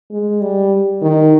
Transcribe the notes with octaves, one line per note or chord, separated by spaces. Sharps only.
G#3
G3
D#3